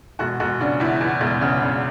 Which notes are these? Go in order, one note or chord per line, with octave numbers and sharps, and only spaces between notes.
E1 F#4
E1 F#4
C#3 D4
E2 E4
E2
E1
C#3
C#3